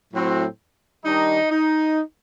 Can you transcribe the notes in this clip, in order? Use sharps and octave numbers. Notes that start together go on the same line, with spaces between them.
A2 F#3 C4
D#3 G3 D4 D#4
D#4